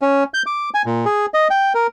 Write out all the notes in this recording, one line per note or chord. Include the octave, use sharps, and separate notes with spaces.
C#4
G6
D6
G#5
A#2
G#4
D#5
G5
A#4